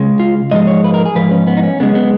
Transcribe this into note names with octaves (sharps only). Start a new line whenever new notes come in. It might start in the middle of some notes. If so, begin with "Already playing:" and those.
Already playing: C#3 G#3
F4
G#2 F3 G#3 D#5
C#5
B4
A#4
G#4
G#2 F3 B4
C#4
B3
D#4
C#4
F#2 C#3 G#3 B3
B3